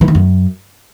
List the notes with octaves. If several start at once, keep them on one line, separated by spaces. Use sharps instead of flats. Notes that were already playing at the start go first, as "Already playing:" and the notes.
E3
D#3
F#2